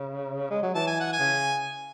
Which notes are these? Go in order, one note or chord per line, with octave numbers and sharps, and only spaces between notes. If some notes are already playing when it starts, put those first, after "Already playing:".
Already playing: C#3
G#3
F#3
E3 A5
G#5
F#5
G#5
C#3